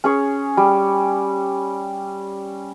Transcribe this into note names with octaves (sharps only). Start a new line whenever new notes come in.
C#4 G#4 C#5
G3